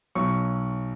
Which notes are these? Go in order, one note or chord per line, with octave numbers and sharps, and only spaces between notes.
B1 B2 F#3 C#6